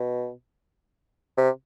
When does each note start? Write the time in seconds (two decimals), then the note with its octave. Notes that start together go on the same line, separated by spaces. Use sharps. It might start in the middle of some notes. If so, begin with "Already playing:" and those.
Already playing: B2
1.38 C3